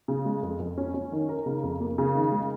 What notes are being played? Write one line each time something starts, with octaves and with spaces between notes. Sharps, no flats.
C#3
G#3
F2
F2
C#4
C#4
D#3
A#4
C#3
F2
A#3
C#3
D#3
G#3